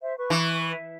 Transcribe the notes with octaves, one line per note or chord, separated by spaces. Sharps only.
C5 E5
B4 C#6
E3